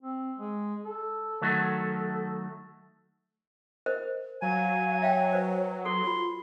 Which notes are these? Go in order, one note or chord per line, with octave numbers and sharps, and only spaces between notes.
C4
G#3
A4
D#3 F#3 A3
A#4 C5 D#5
F#3 F5 G#5
C#5 E5 F5 G5
B4 C5
A4 C6
F4 F#4 B5